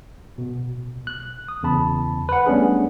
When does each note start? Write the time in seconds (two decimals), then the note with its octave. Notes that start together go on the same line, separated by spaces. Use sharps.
0.38 B2
1.07 F#6
1.48 D#6
1.63 E2 C#3 A5 B5
2.29 B4 F#5
2.46 G3 A3 B3 C#4 D4 G#4